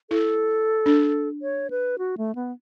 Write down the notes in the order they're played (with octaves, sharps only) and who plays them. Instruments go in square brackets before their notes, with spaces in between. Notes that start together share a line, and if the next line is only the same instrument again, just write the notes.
[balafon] E4 [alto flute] A4
[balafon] D4
[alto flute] C#5
B4
F#4
A3
B3